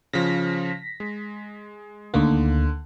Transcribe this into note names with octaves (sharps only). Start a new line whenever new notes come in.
C#3 F3 A#6 B6
G#3
D2 D3 D#3 A#3